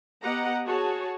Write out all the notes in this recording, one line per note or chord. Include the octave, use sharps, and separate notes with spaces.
B3 G4 D#5 F#5 A#5
F#4 G#4 C#5 A5